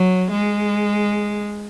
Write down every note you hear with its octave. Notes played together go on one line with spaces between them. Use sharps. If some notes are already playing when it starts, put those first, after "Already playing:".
Already playing: F#3
G#3